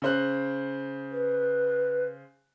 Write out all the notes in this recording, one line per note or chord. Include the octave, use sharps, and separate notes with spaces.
C#3 C5 F#6
B4